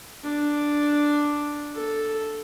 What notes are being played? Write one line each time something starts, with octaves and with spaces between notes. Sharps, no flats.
D4
A4